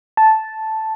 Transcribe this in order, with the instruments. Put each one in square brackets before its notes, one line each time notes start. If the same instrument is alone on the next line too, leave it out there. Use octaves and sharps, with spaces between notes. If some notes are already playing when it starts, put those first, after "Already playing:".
[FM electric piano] A5